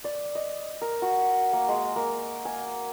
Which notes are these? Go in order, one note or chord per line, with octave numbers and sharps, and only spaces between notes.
D5
D#5
A#4
F#4
A#3
G#3
A#3
G#5